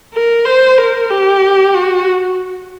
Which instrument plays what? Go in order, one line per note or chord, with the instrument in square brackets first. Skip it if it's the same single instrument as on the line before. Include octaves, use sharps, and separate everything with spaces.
[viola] A#4
C5
A#4
G4
F#4